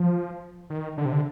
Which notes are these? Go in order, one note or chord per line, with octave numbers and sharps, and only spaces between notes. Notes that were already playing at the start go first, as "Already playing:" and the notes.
Already playing: F3
D#3
D3
C3
D3